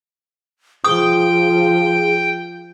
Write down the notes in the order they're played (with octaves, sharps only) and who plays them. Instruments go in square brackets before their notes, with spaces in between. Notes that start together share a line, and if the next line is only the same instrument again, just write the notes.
[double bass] F3 [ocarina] G#4 [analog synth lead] G5 [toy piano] D#6